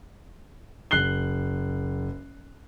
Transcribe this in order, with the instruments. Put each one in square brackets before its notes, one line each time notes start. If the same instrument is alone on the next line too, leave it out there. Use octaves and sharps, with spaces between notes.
[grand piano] F#1 F#6 C7 G7